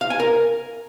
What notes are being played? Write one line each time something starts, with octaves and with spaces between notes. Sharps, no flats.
F5
G#5
A#4